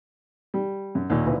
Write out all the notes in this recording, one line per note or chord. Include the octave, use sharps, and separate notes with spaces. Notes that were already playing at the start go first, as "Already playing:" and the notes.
G3
F#2
D#2 A#2 D#3
D2 A#2 E3